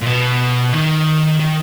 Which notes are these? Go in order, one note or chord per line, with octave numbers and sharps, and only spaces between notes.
A#2
B2
D#3
D#3